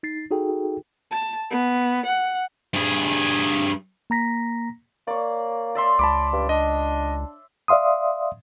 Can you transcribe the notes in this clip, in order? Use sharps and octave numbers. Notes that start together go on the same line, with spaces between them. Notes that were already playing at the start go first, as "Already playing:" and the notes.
D#4 A6 C7
D#4 F#4 G#4 A4 G5
A5
B3
F#5
G2 G#4
A#3 A#5 A#6 B6
A#3 C#5 D5
D5 E5 C6
C#2 A5 B5 D6
G2
D4 D#5
D5 E5 F5 C6 D#6